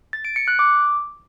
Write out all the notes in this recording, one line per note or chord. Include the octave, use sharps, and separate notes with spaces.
A6
D7
C#7
F#6
D6